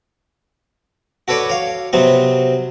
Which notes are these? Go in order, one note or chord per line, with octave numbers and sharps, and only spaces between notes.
F#4 A4 B4 C#5 D5
C#5 F5
C3 F#3 B3 C4